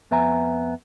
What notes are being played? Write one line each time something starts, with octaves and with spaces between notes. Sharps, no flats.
F2 B3 E5 G#5 A#5